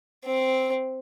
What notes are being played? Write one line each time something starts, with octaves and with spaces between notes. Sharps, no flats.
C4